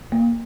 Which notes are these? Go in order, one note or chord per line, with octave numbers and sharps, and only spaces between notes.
A#3